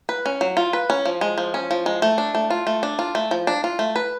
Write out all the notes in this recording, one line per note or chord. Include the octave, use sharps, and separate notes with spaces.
B4
C#4
F#3
F4
B4
C#4
F3
G#3
F3
C#4
F3
G#3
A3
D4
A3
F4
A3
D4
F4
A3
F3
D4
F4
A3
B4